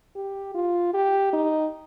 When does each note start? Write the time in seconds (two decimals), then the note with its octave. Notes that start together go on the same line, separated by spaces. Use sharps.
0.16 G4
0.54 F4
0.94 G4
1.33 D#4